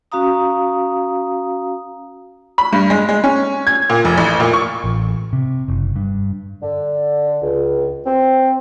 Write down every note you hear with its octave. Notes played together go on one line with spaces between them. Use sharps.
C#4 F#4 F5 A#5 D#6
B5
G2
G#3
G#3
C#4
G#6
A#2
F1
A1
A#2
C#6
A1
C3
F#1
G2
D3
C#2
C4